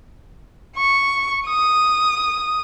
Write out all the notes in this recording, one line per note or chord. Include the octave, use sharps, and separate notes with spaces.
C#6
D#6